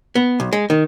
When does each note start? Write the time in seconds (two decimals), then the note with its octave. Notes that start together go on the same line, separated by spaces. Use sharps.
0.15 B3
0.40 B1
0.53 G#3
0.70 D#3